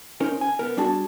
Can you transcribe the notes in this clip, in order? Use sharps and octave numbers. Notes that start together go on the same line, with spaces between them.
C#4 D#4 A#4 C5
G#5
B3 A#4
G3 D4 F#4 G#4 A5